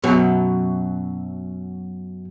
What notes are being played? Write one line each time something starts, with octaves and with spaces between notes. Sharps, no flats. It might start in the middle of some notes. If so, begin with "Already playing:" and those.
F#2 B2 F#3